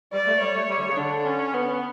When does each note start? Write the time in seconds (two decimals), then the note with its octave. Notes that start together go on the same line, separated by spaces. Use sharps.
0.13 G3 D5
0.27 A3
0.41 G3 C#5
0.55 A3
0.69 G3
0.78 D3
0.89 C#3
0.97 D3 D4
1.26 C#4
1.54 B3